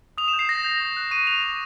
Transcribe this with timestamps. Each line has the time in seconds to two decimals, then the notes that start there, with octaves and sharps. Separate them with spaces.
0.18 D#6 F7
0.28 E7
0.33 G6
0.39 C7
0.49 D#6 A#6
0.64 G6
0.80 C#6
0.97 F#6
1.11 C#6 D#7
1.27 F#6 F7
1.43 D6